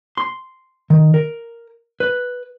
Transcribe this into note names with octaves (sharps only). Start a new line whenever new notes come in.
C6
D#3
A#4
B4